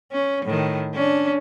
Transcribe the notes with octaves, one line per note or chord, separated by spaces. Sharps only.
C#4
A2 D#3
C#4 D4